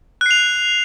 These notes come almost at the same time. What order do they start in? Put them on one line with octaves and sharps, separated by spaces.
F#6 C7 F7